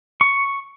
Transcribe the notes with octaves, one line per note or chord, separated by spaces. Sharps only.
C#6